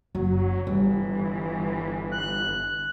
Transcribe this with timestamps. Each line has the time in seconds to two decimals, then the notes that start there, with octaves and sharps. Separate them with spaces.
0.15 F#1 F#3
0.67 G1 E3 G3
2.12 F#6